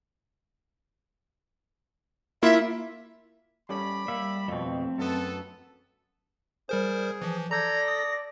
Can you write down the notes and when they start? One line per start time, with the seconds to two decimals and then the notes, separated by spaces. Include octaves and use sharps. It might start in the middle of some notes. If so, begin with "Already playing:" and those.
2.43 A#3 E4 F4 E5
3.69 G3 C#4 A4 D5 B5
4.08 G3 A#3 E5
4.48 F2 B2 A3 C4
4.98 F#2 B3 A4
6.69 G3 G#4 A#4 C5
7.22 E3 F3
7.51 A4 D5 A#5 G6 G#6 A#6
7.88 D#6